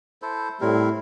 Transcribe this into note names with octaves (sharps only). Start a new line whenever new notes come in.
E4 A4 C5
A2 G3 C4 E4 A#4